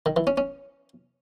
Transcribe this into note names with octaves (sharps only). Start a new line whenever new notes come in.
D#3
E3
C#4
C#4